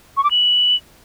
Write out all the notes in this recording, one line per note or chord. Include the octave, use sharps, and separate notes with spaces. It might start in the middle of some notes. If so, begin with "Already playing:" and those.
C#6
D6
F#7